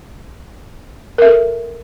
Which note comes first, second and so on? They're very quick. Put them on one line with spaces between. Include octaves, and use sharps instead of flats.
A#4 E5 A4